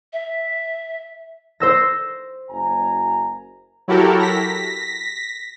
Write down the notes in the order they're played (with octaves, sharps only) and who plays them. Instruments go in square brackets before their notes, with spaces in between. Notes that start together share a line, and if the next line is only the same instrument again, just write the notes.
[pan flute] E5
[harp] C5 E6 A#6
[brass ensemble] F#1 G#5 A#5
[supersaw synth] F#3 E4 F#4 G4 A4 A#4
A#6 B6